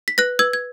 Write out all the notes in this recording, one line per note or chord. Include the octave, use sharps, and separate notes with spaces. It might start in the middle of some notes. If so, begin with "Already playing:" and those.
B6
B4 F#6 A#6
B4 E6 G#6
G#6